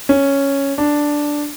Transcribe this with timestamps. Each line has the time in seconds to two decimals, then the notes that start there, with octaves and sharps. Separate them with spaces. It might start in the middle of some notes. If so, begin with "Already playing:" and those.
0.09 C#4
0.78 D4